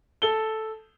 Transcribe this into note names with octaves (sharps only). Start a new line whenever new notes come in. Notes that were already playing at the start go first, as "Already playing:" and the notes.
A4 G7